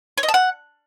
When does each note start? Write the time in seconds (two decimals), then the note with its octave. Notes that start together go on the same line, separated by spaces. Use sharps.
0.18 C#5
0.23 D#5
0.28 A5
0.34 F#5